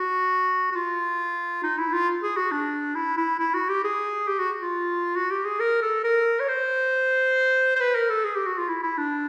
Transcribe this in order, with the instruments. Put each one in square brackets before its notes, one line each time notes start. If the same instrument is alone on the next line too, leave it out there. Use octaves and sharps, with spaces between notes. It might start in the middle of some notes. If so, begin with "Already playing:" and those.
Already playing: [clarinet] F#4
F#4
F4
D#4
E4
F4
G#4
F#4
D4
E4
E4
E4
F#4
G4
G#4
G4
F#4
F4
F#4
G4
G#4
A#4
A4
A#4
C#5
C5
C5
B4
A#4
A4
G#4
G4
F#4
F4
E4
E4
D4